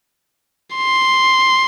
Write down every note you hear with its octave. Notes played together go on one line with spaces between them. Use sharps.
C6